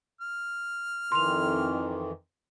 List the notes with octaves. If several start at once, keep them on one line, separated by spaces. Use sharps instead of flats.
F6
F2 D#3 E3 C6 F7